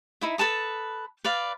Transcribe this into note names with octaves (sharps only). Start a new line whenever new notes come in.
D#4 E4 E5
A4 B4 A5 D#6
B4 D5 F5